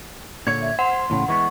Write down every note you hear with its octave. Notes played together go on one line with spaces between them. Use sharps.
A#2 D3 C#5 G#6
E5
C5 F#5 C6
E2 A2 C#3
E3 G#3 B3 C#6